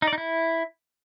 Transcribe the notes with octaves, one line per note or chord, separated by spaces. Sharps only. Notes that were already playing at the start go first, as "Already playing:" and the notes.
D#4
D5
D#4
E4